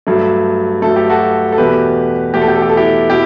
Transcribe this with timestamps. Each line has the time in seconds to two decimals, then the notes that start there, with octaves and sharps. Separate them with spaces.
0.07 G2 F#3 A3
0.82 G2 F#3 A3 A4
0.96 G4
1.10 F#4 A4
1.52 A4
1.58 E2 B2 A3 G4 B4
2.34 E2 B2 A3 G4
2.42 A4
2.48 G4
2.55 A4
2.62 G4
2.69 A4
2.77 E4 G4
3.10 B2 E4 G4